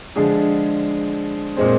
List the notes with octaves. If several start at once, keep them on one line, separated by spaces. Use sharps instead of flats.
D3 F3 G#3 D4 G#4
A#2 G#3 C4